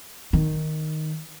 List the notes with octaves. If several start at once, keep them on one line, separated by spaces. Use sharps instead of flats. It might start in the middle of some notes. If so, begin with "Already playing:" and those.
D#3